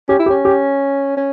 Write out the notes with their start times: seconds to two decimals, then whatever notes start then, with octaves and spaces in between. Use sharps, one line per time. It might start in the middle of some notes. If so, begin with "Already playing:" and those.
0.09 C#4 G4
0.19 E4
0.26 G4
0.30 C#4
0.45 G4
1.17 C#4